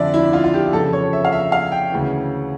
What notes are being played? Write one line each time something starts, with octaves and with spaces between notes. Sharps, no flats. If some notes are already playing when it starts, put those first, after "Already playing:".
Already playing: F2 D3 D5 E5
E4
F4
F4
G4
F2 C#3 E3 A4
C#5
E5
F5
E5
F5
G5
D2 C#3 E3